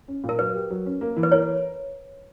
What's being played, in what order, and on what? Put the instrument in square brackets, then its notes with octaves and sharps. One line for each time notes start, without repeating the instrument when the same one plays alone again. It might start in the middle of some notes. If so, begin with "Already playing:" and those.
[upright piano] C#4
A#2
[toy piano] A#4
[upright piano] F#3 [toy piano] B4
[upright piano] G4
F#3
C#4
A#3
E3
[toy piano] B4
[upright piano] A#4 [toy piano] C#5